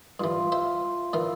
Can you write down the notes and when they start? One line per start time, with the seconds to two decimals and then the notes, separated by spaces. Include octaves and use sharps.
0.20 G2 E3 F4
0.52 C5 E5
1.13 A#2 E3 E4 F5